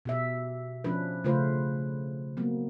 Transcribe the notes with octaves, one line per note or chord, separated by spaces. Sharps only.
B2 G4 E5
F3 C#4 D4 B4
C#3 A3 F4 B4 C5
F#3 A#3 B3